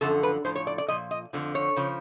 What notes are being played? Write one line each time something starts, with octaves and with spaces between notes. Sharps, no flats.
F#2 D3 F3 A4
B4
A2 F3 C5
C#5
D5
D5
A#2 F3 D#5
D#5
F2 D3 F3
C#5
C#3 F3